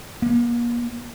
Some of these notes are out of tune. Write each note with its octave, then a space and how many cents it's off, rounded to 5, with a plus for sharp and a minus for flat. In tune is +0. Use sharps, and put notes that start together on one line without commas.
A#3 +35